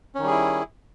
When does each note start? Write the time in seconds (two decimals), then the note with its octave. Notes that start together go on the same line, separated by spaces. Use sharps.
0.15 C#4
0.19 D#3
0.23 G3
0.27 G#4
0.31 E4